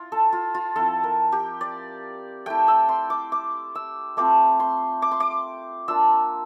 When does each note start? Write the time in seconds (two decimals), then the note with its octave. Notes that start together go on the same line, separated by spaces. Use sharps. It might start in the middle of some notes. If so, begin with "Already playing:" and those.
Already playing: E4 F4
0.12 A4
0.33 F4
0.55 F4
0.76 F3 C4 E4 A4
1.04 A#4
1.32 G4
1.61 D5
2.46 A3 E4 G5
2.68 E6
2.89 C6
3.10 D6
3.32 D6
3.75 E6
4.17 A3 C4 F4 D6
4.60 C6
5.02 D6
5.11 C6
5.20 D6
5.88 A#3 D4 F4 E6